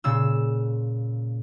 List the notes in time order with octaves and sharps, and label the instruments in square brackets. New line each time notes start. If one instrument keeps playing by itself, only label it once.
[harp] A#2 C#3 E6